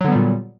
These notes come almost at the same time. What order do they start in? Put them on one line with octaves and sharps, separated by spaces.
F#3 D3 B3 G3 A#2